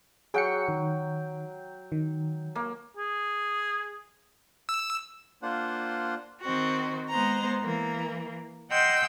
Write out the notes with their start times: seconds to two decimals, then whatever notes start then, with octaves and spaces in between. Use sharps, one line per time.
0.34 F#3 G#4 F#5 G5 C#7
0.68 D#3
1.92 D#3
2.56 A#3
2.97 G#4
4.69 E6
5.42 A#3 D4 F4 C5 F#5
6.41 D#3 C4 F#4
7.09 G#3 B3 C5 A#5
7.61 E3 A#3
8.71 D#5 F#5 G5 C6 E6 G6